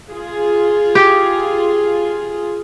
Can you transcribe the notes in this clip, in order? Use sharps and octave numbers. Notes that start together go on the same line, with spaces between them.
F4 G#4
G4